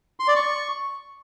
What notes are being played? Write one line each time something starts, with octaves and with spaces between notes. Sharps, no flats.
C6
D5
C#6